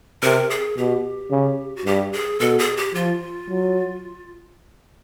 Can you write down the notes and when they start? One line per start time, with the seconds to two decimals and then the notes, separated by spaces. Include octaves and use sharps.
0.22 C3 A#4
0.50 G#4
0.77 B2 G4
1.31 C#3
1.76 F#4
1.85 G2 G4
2.13 G#4
2.40 B2 A4
2.59 G#4
2.77 G4
2.94 F3 F4
3.49 F#3